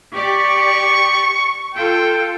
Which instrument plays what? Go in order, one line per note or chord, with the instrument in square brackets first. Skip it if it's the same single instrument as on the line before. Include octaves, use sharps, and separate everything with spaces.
[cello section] G4 D5 [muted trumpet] C#6
[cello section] F4 A4 [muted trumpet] G5